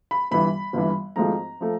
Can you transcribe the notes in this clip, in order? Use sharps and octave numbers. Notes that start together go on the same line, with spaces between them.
B5
G1 G2 E3 B5
G1 G2 E3
G#1 G#2 F3 A3 A#5
F3 A3